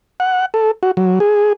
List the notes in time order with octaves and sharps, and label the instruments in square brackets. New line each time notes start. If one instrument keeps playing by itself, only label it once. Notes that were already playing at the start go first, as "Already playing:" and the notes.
[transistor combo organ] F#5
A4
F#4
F#3
G#4